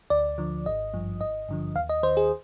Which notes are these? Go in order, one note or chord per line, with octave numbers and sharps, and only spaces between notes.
D2 D5
D3 F3
G#1 D#5
G2 F3
G#1 D#5
G2 D3 F3
D#2 F5
D#5
D#3 C5
G#4